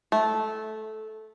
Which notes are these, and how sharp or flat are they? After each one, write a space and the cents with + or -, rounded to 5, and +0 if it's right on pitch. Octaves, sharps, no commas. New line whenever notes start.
A3 -15